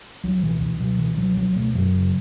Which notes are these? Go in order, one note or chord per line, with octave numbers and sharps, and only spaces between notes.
C#2 F#3
B2 E3
C#2 E3
B2 F#3
C#2 E3
B2 F#3
C#2 F#3
B2 A3
F#2 F#3
C#3